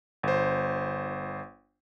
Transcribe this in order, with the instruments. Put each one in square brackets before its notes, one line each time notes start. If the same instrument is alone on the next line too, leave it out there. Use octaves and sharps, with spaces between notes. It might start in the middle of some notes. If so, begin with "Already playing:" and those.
[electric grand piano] G1 C5